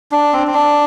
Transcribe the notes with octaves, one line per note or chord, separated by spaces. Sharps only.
D4
C4
C4
D4